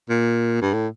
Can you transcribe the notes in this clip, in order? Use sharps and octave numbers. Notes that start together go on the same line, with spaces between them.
A#2
G2
A2